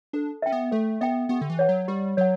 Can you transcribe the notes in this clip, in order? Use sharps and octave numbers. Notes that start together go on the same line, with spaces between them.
D4 A4
C#4 E5 G5
B3
A3 A4
B3 E5 G5
B3 G4
D3
E3
C#5 F#5
F#3
G3 G4
F#3 C#5 F#5